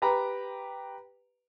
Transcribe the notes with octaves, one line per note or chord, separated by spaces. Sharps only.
G4 B4 A#5 B5